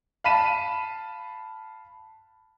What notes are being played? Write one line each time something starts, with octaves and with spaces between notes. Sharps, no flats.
F5 A5 B5 B6 D#7 E7